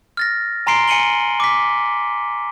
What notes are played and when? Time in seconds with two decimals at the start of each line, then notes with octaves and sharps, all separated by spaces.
0.17 F6 A6 A#6
0.67 G#5 A#5 C6 C7 D7 G7
0.88 G#5 C#7 D#7 F#7 G7
1.40 D6 B6